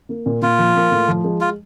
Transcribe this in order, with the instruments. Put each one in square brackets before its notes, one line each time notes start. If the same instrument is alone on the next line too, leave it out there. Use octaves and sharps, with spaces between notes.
[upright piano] A#3
A#2
[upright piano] A#2 [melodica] F4
[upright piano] F3
A#3
A2
F3
G#3
[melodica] F4